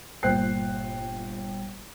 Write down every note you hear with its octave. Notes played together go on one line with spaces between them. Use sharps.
G1 A#2 C5 G5 F#6 C7